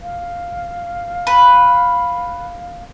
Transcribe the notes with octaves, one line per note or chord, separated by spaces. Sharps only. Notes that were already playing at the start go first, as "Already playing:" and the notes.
F5
B4